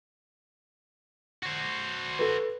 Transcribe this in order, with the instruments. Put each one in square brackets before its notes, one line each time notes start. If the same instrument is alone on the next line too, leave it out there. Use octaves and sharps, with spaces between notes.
[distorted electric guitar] F#4 C5
[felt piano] A4 B4